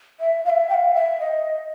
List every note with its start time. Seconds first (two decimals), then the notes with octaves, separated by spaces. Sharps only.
0.20 E5
0.45 F5
0.50 E5
0.70 G5
0.74 F5
0.94 E5
1.20 D#5